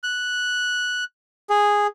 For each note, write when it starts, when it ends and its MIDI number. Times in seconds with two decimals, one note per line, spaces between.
0.03 1.04 90
1.50 1.87 68